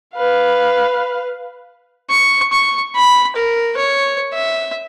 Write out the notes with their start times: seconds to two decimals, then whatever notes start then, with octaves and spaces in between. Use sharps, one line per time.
0.15 B4 F5
2.10 C#6
2.52 C#6
2.96 B5
3.36 A#4
3.77 C#5
4.33 E5